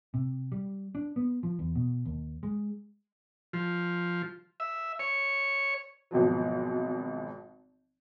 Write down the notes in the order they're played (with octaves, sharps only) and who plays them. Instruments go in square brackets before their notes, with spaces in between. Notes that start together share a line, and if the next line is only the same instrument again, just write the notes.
[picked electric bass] C3
G3
D4
B3
F3
E2
B2
D#2
G#3
[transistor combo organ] F3
E5
C#5
[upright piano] G#1 B2 F3 F#3